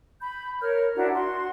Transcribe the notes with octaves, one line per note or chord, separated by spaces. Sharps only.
B5 G6
A#4 C#5 F6
D4 E4 F#4 A#4
F#4 C6